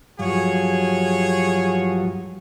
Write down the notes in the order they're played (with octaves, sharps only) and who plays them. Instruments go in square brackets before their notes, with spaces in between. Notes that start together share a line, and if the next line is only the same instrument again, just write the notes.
[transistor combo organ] G2 F3 F#3 [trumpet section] G#4 C#5